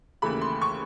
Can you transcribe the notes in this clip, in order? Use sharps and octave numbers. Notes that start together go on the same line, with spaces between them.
D#2 C#3 E3 A3 B5
C6
C#6